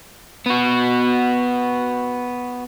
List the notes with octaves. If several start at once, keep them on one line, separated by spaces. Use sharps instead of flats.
B3 F#4